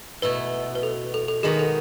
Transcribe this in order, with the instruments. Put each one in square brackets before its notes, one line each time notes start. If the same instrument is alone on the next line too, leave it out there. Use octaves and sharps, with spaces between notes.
[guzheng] B2 A3 E4 [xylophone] B4
[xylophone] B4
A4
A4
A4
[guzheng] D#3 G#3 B3 F#4 B4 [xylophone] G#4
[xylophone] A4